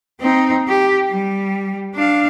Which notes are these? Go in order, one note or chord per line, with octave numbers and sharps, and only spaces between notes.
C4 D#4
G4
G3
D4 F5